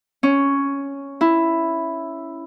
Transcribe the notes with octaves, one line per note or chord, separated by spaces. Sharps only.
C#4
E4